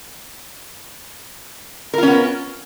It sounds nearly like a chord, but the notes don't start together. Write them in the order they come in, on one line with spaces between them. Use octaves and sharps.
A#4 F4 C#4 B3